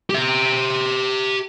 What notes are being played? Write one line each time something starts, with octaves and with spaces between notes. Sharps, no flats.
G4 E5